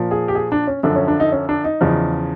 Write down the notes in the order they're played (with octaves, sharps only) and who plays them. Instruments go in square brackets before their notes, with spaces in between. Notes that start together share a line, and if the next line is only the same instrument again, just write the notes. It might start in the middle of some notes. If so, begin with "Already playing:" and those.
Already playing: [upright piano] A#2 F3
G#4
G4
G#4
D4
C#4
F#2 D3 F3 D4
C#4
D4
D#4
C#4
D4
D#4
E2 C#3 F3